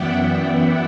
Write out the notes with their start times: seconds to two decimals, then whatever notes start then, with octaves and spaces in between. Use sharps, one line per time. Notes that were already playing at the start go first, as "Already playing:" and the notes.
Already playing: F#2 E3 B3 D5 E5 F#5 G5
0.28 D5 F#5